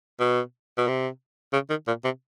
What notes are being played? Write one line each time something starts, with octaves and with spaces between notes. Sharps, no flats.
B2
B2
C3
C#3
D#3
A#2
C3